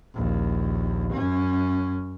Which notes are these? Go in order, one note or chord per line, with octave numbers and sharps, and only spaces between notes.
A#1 D#2
F#2 C#4